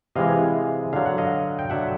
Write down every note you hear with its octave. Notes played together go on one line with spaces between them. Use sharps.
C3 E3 G#3 D#5 F5
D3 F#3 F5
F#5
D#5 F5
G5
D3 F#3 E5 F#5